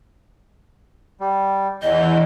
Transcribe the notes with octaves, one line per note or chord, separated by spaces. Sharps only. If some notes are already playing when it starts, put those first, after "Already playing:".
G3
E2 E3 D#5 G6